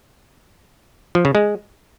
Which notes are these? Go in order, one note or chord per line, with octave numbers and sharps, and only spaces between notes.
F3
C#3
G#3